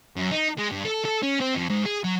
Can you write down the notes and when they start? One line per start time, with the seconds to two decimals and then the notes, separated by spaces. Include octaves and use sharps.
0.16 F#2
0.31 D#4
0.58 G#3
0.71 G2
0.85 A4
1.05 A4
1.23 C#4
1.41 C4
1.55 F2
1.70 G#2
1.86 G#4
2.04 F#3